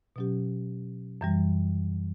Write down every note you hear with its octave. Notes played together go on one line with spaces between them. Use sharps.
B2 F#3 C#4 G4
F#2 E3 G3